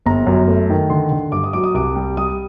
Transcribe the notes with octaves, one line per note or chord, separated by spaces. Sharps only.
G1 A#5
F#2
A3
D#3
D3 C6
D3
G2 D6
D#6
F#3 D6
D#6
C2 D6
G3
G3 D#6